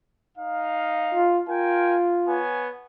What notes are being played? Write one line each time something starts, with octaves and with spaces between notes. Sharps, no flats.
D#4 F5
F4
F4 A#4 G5 G#5
B3 C#5 G#5